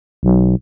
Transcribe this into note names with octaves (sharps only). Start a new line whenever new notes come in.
B1